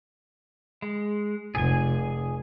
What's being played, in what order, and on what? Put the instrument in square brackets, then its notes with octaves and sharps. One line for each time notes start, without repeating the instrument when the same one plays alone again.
[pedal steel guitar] G#3
[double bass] F1 [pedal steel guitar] G#4 G#5